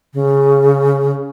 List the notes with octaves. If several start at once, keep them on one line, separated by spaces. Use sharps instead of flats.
C#3